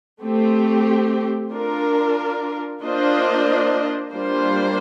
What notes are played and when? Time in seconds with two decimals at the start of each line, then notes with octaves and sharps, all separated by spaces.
0.22 A3 C4 G4
1.52 D4 F4 A#4
2.82 A#3 D4 F4 C5 D#5
4.13 G3 A#3 D4 F4 C5